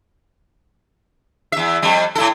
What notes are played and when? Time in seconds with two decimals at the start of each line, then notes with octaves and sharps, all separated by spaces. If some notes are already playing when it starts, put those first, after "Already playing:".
1.52 E2 E5
1.82 F2 G3
2.15 A2 E4 A4